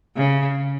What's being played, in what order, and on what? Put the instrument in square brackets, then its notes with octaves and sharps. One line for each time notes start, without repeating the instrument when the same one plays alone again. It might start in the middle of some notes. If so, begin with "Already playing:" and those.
[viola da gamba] C#3